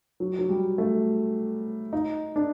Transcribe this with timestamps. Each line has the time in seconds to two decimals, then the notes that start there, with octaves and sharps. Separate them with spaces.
0.20 F#3
0.39 F#3
0.49 G3
0.78 A3
1.93 D#4
2.36 D4